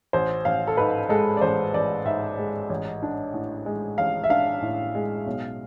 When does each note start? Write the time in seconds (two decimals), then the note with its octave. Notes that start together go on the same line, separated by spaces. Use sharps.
0.13 A1 C5
0.45 A1 F5
0.67 A4
0.77 G#2 B4
1.09 G#3 A4
1.37 D5
1.41 A1 C5
1.74 A1 D5
2.05 G#2 E5
2.38 G#3
2.70 A1
3.03 D4
3.34 A2
3.66 G#3
3.98 A1 F5
4.24 E5
4.30 D4 F5
4.62 A2
4.95 G#3
5.27 B1